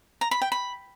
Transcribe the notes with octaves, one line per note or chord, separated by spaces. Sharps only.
A#5
B5
G5
B5